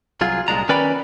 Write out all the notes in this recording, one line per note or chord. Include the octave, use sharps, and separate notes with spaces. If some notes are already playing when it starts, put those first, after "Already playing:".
C2 F#3 F4 G#4
C2 A#2 G#3 D4 A#5
D#3 C#4 B4 D5 G5 B5